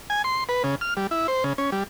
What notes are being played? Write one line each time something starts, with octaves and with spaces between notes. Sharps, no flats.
G#5
C6
B4
C#3
F6
G3
E4
C5
C#3
C#4
G3